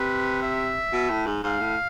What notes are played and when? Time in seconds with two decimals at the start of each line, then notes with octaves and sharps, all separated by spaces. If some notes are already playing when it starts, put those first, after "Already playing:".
Already playing: C3 B4
0.42 E5
0.92 B2
1.10 A2
1.27 G#2
1.43 G#2 F5
1.60 A2